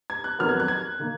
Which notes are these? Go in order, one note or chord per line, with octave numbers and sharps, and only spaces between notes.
G#6
F#6
F2 D#3 F#3 B3 F6
G#6
F#6
G#6
D#3 A#3